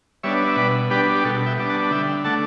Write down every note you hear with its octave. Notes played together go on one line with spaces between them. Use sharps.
G3 B3 D4 C#5 E5
E5
B2 B4 D5
G3 B3 D4 G4 B4
G4
B2 F#4 A4
E5 G5
G3 B3 D4
F#5 A5
D3 E5 G5
A3 D4 F#5 A5